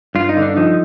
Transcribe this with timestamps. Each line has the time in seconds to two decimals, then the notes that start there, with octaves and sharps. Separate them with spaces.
0.15 G2 F4
0.29 D#4
0.37 D3 D4
0.57 F3 D#4